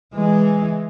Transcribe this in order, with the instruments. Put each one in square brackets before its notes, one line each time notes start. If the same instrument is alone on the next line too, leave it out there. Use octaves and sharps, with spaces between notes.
[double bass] E3 G#3